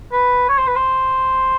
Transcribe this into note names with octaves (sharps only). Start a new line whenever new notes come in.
B4
C#5
C5
B4
C5